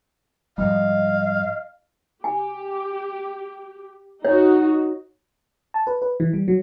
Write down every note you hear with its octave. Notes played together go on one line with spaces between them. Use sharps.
G#2 F3 G3 D#5 F5
G4 G#5
D#4 F#4 C#5
A5
B4
B4
E3
G3
F#3